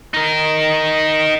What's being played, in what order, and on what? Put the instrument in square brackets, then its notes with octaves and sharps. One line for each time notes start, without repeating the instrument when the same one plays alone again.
[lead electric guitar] D#4 A#4